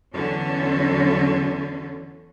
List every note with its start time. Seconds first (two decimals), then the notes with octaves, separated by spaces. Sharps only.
0.14 E2 D3 E3 F#3 C#4